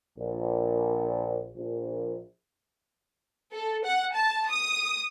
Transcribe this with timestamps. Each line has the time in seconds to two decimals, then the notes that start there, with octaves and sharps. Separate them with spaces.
0.18 A#1
1.56 A#1
3.53 A4
3.85 F#5
4.14 A5
4.50 D#6